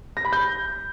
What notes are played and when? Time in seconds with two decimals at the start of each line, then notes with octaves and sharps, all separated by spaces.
0.17 A#6
0.25 B5
0.33 G6